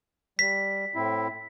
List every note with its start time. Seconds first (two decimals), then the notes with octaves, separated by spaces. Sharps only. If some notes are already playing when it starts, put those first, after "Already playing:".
0.39 G3 B6
0.95 A2 C4 E4